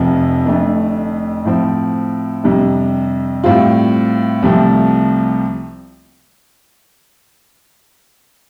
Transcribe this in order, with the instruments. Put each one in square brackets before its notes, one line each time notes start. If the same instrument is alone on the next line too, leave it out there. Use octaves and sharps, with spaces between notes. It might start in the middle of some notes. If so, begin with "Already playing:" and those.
Already playing: [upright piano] F1 F2 C3 F3
F1 F2 D3 A3
A2 F3 C4
F2 C3 G3 D4
A2 G3 C4 F4
C2 C3 F3 A3